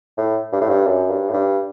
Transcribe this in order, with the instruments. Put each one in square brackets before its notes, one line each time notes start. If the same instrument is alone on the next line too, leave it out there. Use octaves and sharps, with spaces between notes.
[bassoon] A2
G2
A2
G2
F#2
G2
A2
G2